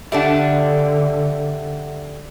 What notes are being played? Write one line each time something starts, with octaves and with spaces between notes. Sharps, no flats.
D3 G3 A3 D4 E5 F#5